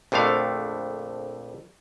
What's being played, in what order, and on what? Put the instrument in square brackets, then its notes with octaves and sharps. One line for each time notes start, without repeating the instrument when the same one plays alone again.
[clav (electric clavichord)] A#1 F2 D3 A3 F5